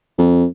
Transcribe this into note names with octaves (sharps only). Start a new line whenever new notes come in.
F2